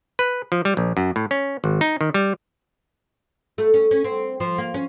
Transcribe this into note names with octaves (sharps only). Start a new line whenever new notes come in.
B4
F3
G3
A#1
F#2
A2
C#4
G#1
D#4
D#3
G3
A3
C#4
C#4
C4
F3
A#3
C#4